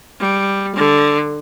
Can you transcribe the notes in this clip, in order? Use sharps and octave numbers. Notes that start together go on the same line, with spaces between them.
G3
D3